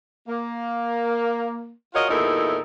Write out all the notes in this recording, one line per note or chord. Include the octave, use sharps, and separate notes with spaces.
A#3
F4 F#4 G#4 A#4 C#5 D#5
E2 A#2 D#4 E4 A4 A#4